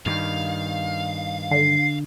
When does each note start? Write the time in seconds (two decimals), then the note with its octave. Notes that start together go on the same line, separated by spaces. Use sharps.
0.06 G2 D#3 F5
1.51 D3 C7